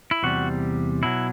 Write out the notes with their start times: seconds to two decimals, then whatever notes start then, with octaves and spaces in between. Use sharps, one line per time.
0.11 E4
0.23 E2 C3 G3 F#4
1.03 B2 F#3 E4